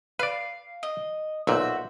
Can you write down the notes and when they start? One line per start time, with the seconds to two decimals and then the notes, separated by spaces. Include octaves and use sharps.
0.19 B4 D5 F5
0.83 D#5
1.47 B1 A#2 F#4 C5 E5